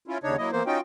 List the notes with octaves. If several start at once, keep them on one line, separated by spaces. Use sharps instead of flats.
C#4 E4 F4
D#2 C#3 D4 D#4 C#5
F#3 A#3 E4 D#5
E3 A#3 B3 C5
C#4 D#4 F4 F#4 G5